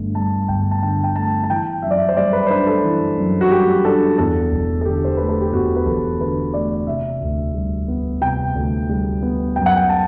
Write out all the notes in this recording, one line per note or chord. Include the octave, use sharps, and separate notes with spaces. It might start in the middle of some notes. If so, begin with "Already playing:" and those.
Already playing: G1 G2 D3 A3
G2 A5
G1 G5
A5
D3 G5
G5
A3 A5
A5
E3 G5
F#2 E5
D5
E5
C5
G3 D5
B4
C5
D4 B4
A4
E3
F#2
F#4
G3 G4
D4 A4
E2 A4
E1
A4
D3 G4
C5
A3 B4
A4
G4
E2 F#4
B4
E1 A4
D3 B4
A3 D5
C3 E5
D2
G3
B3
C3 G5
D2
G3
B3
F#2 G5
F#5
G5
A5